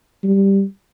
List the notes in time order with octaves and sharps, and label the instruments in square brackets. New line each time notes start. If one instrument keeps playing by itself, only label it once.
[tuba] G3